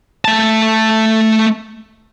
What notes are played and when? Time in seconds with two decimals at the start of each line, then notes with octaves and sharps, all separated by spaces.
0.25 A3 A5